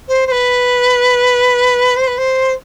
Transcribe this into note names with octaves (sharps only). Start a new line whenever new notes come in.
C5
C5
B4
C5
B4
C5